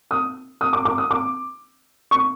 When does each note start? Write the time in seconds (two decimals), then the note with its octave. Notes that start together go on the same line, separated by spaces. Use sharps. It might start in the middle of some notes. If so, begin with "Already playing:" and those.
0.11 D#6
0.61 D#6
0.73 D6
0.85 D6
0.98 D#6
1.11 D6
2.11 C#6